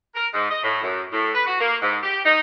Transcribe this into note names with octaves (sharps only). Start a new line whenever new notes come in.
A#4
G#2
D#5
A2
F#2
A2
B4
F#4
A#3
G#2
G4
D#4